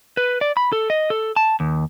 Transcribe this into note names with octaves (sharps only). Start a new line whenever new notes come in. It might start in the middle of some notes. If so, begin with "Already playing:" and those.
B4
D5
B5
A4
D#5
A4
A5
D#2